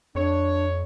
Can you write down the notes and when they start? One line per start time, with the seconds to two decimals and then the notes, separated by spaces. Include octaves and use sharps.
0.15 F2 D4 C#5